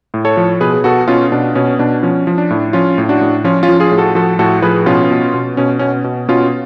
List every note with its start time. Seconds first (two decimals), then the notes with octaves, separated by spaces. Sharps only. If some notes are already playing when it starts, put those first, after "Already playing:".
0.14 A2
0.25 A4 C#5
0.37 F3
0.61 B2 G#4 B4
0.84 B2 F#4 A4
1.07 B2 C#4 F4
1.32 B2 D4
1.55 B2 C#4
1.79 B2 D4
2.03 F3 C#4
2.27 F3
2.38 D4
2.50 A2
2.73 F3 C#4 F4
2.98 A2
3.09 D4 F#4
3.21 A2
3.44 F3 C#4 F4
3.63 C#4 F4
3.69 F3
3.80 F4 G#4
3.91 A2
3.98 F#4 A4
4.15 F3 F#4 A4
4.39 A2 F#4 A4
4.62 F3 G#4 B4
4.86 B2 C#4 F4
5.11 B2
5.34 B2
5.57 B2 C#4
5.79 B2 C#4
6.04 B2
6.28 B2 C#4 F4